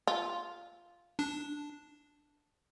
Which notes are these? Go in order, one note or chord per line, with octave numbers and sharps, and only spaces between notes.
F4
D4